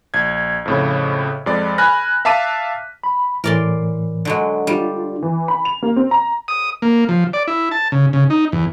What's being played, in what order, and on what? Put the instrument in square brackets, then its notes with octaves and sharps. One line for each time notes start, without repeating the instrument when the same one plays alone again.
[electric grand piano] A#1 G#6
F2 A2 C#3
F2 G#3 D5
G#5 B5 F6 F#6 A#6
E5 F5 A5 D6 B6 D#7
[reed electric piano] B5
[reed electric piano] A2 E3 [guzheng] A#4 D5 C6
[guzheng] D3 F#3 G#3
[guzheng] G3 [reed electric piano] D4 F4
[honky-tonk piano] E3
B5
F7
A#3
C4
A#5
[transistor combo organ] D#6
A#3
F3
D5
E4
A5
C#3
C#3
D#4
E2